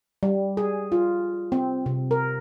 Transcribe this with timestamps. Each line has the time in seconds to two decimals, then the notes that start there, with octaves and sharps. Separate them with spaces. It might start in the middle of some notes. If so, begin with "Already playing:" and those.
0.23 G3
0.57 G#4
0.92 F4
1.52 C4
1.86 C3
2.11 A#4